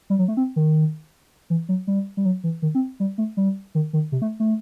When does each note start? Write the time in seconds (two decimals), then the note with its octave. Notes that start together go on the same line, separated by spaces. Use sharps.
0.10 G3
0.19 F#3
0.28 A3
0.37 C4
0.56 D#3
1.50 E3
1.69 F#3
1.87 G3
2.17 G3
2.25 F#3
2.44 E3
2.62 D#3
2.75 C4
3.00 G3
3.18 A3
3.37 G3
3.75 D#3
3.93 D#3
4.12 C3
4.22 A3
4.40 A3